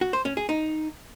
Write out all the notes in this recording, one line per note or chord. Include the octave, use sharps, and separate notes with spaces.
F#4
C5
C#4
G#4
D#4